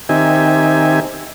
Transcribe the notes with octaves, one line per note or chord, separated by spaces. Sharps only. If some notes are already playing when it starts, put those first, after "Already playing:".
D#3 C4 D#4 G4 E5 G#5